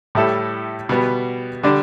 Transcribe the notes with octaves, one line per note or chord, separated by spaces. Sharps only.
A2 G3 E4 A4
B2 G3 B3
D3 G3 D4